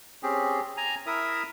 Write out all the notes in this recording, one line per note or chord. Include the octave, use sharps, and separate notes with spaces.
C4 C#4 G4 G#4
G#5 A#5
E4 A#4 E5 D#6